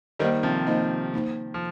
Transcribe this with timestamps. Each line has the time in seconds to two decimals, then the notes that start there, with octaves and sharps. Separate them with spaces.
0.19 D#3 G3 A#3 D#4 C5 D#5
0.43 C3 F3
0.67 A#3 D#4 C5 D#5
1.13 A#3 D#4 C5
1.54 F3